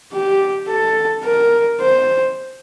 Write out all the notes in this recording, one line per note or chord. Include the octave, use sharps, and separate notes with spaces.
G4
A4
A#4
C5